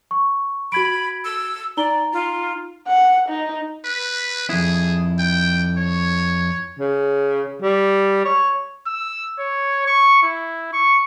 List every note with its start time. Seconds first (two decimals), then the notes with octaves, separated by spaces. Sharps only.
0.11 C#6
0.72 F#4 B5 G#6 D7
1.25 E6
1.77 D#4 D5 A#5 G7
2.13 F4
2.87 F#5
3.29 D#4
3.85 B4
4.49 F2 E4 G#4
5.19 G5
5.77 C#5
6.79 C#3
7.62 G3
8.25 C#5
8.87 E6
9.39 C#5
9.87 C#6
10.23 E4
10.73 C#6